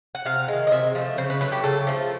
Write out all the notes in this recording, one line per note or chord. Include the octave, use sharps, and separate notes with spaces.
F#5
C3 F5
D#3 G#3
D#5
C3 E5
F3 A3
C#3 C5
B4
F#3 A3 B4
G4
C#3 A4
F3 A3